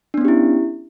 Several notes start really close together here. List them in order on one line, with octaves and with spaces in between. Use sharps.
D4 B3 C#4 G4 E4